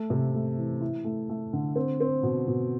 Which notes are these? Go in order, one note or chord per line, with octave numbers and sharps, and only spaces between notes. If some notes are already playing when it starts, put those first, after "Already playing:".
Already playing: A3
C3
A3
E3
E4
A3
A3
D3
C4
C4
B2
B2